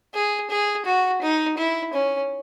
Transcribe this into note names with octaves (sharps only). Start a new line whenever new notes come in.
G#4
G#4
F#4
D#4
E4
C#4